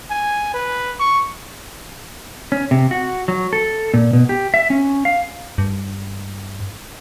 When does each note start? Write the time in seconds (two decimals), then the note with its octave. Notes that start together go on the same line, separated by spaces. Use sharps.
0.11 G#5
0.54 B4
1.00 C#6
2.52 C#4
2.71 C3
2.91 F#4
3.28 F#3
3.53 A4
3.94 A#2
4.13 B2
4.29 G4
4.54 E5
4.70 C#4
5.05 F5
5.58 G2